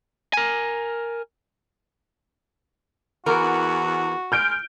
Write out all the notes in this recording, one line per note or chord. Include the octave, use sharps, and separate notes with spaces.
A#4 G#5
E2 E3 F#4 A#4
G#3 F6 G6 D7